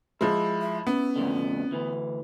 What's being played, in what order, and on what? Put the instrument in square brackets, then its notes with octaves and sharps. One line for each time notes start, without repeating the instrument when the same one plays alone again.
[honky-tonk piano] F3 G#3 [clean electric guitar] E4
[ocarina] E5
[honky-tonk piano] B3 [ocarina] C#4
[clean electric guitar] F2 A2 D3
D2 E3